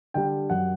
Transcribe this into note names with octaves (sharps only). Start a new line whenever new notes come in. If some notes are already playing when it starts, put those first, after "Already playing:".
D3 G3 G5
F#2 F#5